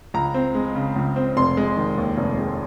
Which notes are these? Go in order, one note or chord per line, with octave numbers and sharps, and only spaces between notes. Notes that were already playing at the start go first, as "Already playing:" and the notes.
C#2 A#5
C4
G#3
C#3
C#2
C4
F1 C6
G#3
D#3
D#2
F1
G#3